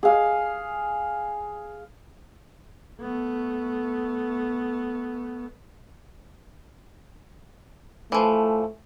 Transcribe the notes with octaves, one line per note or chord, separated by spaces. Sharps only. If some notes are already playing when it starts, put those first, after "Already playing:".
G#4 F5
A3 B3
E3 F3 A3